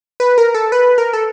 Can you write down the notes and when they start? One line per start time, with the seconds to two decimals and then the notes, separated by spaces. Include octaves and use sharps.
0.20 B4
0.38 A#4
0.54 A4
0.72 B4
0.98 A#4
1.13 A4